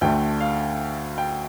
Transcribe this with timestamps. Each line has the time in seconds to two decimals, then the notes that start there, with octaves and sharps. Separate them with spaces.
0.01 D2 D3 A3 G5
0.41 F5
1.18 G5